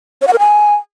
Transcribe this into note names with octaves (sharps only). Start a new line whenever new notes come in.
C#5
F#5
A#4
G#5